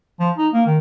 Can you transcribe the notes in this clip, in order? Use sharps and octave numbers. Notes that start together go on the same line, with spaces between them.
F3
D#4
A#3
D#3